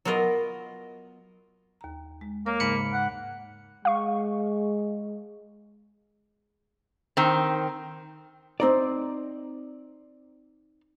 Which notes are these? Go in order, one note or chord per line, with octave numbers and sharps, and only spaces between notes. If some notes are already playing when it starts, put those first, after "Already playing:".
F#3 B3 F4 A#4 D#5
D#2 A#5
G#3
A#3 A#4 C#5
G#2 C#3 B5 C#7
F#5
G#3 F5 C#6
D#3 C4
C4 D#4 D5